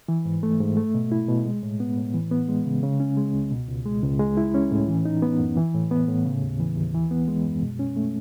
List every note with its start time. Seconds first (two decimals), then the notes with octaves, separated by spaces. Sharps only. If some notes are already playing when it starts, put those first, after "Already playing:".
0.08 E3
0.25 G#2
0.43 A3
0.60 G#2
0.77 A3
0.94 B2
1.12 E4
1.28 B2
1.45 G#3
1.63 A2
1.80 B3
1.97 A2
2.14 E3
2.31 B3
2.49 G#3
2.66 C#3
2.83 C#3
3.00 C#4
3.17 G#3
3.34 C#2
3.51 B2
3.68 C#2
3.85 G#3
4.03 C#2
4.20 G#3
4.37 E4
4.54 C#4
4.72 A2
4.88 E3
5.05 D#4
5.22 B3
5.40 F#2
5.57 E3
5.74 A2
5.91 B3
6.08 A2
6.25 C#3
6.42 D#2
6.59 E3
6.77 D#2
6.94 E3
7.11 B3
7.28 G#3
7.45 F#2
7.62 B2
7.79 C#4
7.97 A3